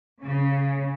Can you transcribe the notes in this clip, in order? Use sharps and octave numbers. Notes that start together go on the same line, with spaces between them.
C#3